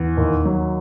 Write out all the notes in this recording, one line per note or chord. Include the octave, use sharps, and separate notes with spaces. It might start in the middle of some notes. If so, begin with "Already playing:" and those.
Already playing: E2
D#2
F#3